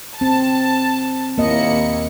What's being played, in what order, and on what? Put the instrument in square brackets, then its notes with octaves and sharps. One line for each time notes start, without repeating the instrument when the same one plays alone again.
[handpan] C4 [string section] A5
[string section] D#2 E4 C#7 [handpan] A#3 D#5